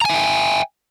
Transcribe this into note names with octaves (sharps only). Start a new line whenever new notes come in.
E5 G5 G#5 A#5